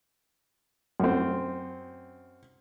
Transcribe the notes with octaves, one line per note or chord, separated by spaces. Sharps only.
F#2 C4